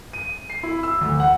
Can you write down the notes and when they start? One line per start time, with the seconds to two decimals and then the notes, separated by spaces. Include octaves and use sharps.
0.13 D#7
0.50 C7
0.63 E4
0.83 E6
1.01 D2
1.20 F#5